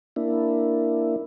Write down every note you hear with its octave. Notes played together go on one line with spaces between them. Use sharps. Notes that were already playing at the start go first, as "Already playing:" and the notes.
A#3 D4 E4